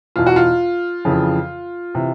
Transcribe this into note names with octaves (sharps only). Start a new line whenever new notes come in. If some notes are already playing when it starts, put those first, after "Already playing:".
E2 B2 F4
F#4
F4
F2 C#3 E3
C3 E3